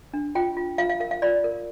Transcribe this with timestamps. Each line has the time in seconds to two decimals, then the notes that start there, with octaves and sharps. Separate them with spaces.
0.14 D4
0.35 F4 G5
0.57 F4
0.78 F4 F5
0.90 F5
1.00 A#4 F5
1.11 F5
1.22 F4 D5
1.44 A#4